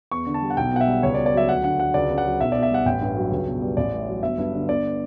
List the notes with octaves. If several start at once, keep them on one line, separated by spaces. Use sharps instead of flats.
E2 C#6
D3
A5
G3
F#5
B1 G5
B2 F#5
E5
G3
C#2 C#5
D5
B2
D5
F#3 E5
D2 F#5
D3 F#5
F#3 F#5
C#2 D5
C#3
F#5
F#3
B1 E5
B2 D5
E5
G3 F#5
A1 G5
G2
F#3
C#2
B2
G3
A1 D5
A2
F#3
G1 E5
G2
D3
G1 D5